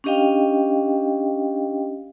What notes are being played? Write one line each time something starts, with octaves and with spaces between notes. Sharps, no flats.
C#4 D4 G4 D#5 F5 G5